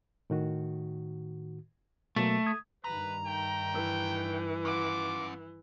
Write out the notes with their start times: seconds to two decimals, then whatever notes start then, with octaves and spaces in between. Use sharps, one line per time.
0.30 A2 D#3 F#4
2.16 B2 F#3 A3 A#3
2.46 D#6 G#6
2.84 G2 D#3 B4 A#5
3.26 A3 G5
3.74 E3
4.65 C#4 F4 F#5 D6